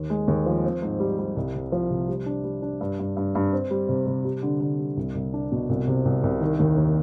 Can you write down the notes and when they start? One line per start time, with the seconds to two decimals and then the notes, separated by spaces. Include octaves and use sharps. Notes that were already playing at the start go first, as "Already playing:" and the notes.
Already playing: D#2
0.10 G#3
0.28 D#2
0.46 F3
0.64 C4
0.82 G#2
1.00 G3
1.19 G3
1.36 C2
1.55 C3
1.72 F3
1.90 C3
2.08 G3
2.26 D4
2.44 G3
2.62 D4
2.81 G2
2.99 G2
3.17 G2
3.35 G2
3.53 C4
3.71 G3
3.89 C3
4.06 C3
4.25 G3
4.43 D3
4.60 D3
4.79 G3
4.97 C2
5.15 C2
5.34 D4
5.52 B2
5.69 C2
5.87 C3
6.05 C2
6.23 C2
6.41 D#3
6.59 D#2
6.77 D#2